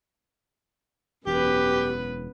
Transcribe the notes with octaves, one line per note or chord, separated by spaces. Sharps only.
E1 F#2 B3 G4 B4